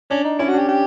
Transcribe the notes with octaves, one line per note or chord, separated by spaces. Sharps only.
C#4 D4
D#4
C#4 E4
F#4
D4 G4
G4